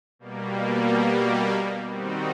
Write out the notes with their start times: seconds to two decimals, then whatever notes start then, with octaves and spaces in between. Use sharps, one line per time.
0.19 B2 G3 A#3
1.87 D#3 G3 C4 D#4 F#4